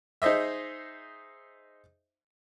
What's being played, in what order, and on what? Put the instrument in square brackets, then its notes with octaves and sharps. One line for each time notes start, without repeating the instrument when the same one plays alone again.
[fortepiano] D#4 G#4 C5 D#5 E5